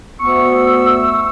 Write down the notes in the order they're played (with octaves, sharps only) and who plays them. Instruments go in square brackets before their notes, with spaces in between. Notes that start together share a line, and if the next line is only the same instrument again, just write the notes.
[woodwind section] D2 B3 C#6 E6